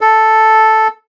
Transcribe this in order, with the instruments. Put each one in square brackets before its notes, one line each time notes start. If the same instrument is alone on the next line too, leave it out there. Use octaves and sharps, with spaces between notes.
[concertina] A4